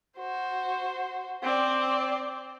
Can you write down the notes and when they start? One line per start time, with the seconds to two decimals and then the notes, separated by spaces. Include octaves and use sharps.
0.17 F#4 C5
1.43 C4 D5